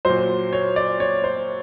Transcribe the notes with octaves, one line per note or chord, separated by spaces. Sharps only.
A#2 F#3 C5
C#5
D5
C#5
C5